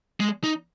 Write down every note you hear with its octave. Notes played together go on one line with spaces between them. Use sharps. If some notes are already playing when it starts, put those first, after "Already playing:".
G#3
D#4